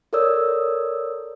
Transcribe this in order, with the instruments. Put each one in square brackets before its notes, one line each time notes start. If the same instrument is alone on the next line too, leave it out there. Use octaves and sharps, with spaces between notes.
[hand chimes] A4 A#4 C#5 D5 D#6 E6